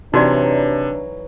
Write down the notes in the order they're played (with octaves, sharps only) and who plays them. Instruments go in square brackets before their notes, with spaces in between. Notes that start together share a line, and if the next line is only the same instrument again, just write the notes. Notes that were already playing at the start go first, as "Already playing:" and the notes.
[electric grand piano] C3 [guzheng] E3 F#3 A#4 [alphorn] D4 [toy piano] D#4 F#4 D5